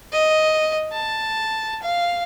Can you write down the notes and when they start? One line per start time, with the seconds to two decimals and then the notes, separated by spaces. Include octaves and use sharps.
0.12 D#5
0.93 A5
1.82 F5